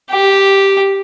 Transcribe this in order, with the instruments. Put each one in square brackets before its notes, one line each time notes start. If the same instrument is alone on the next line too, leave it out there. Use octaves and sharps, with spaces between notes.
[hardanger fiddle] G4